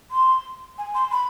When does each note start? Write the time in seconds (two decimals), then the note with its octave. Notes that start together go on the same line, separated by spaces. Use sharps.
0.11 C6
0.78 G#5
0.95 C6
1.11 B5